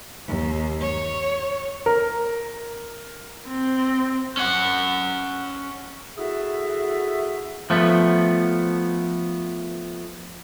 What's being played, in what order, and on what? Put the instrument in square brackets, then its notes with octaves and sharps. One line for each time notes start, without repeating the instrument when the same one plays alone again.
[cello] D#2
C#5
[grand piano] A#4
[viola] C4
[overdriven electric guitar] C#4 F#5
[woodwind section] E4 F#4 G#4 A4 E5
[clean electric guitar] F3 A3 B3